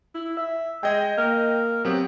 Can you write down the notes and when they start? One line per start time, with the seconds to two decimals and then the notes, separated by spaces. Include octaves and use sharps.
0.15 E4
0.37 E5
0.83 G#3 D#5 G5
1.18 A#3
1.85 F#3 B3 C4 G4